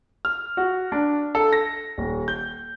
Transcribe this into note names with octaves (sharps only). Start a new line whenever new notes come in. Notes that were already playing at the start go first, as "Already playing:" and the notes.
F6
F#4
D4
A4
A#6
D#1
G6